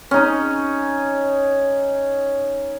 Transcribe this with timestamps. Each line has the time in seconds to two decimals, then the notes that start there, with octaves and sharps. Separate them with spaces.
0.11 C#4 D#4